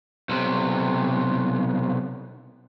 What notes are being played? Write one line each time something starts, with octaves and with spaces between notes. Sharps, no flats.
B1 C3